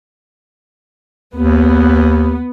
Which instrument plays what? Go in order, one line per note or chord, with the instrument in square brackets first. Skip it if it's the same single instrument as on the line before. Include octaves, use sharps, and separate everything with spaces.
[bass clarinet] D#2 [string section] B3